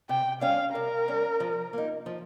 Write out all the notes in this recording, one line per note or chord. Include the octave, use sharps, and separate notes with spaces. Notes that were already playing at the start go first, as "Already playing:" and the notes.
C3 G5
G3 C#4 F5
C3 A#4
G3 C#4
F3
A#3 D#4
F3